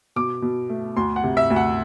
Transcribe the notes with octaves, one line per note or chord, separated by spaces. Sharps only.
B2 D6
B2
A3
D2 C6
F#5
C3
E5
D2
F#5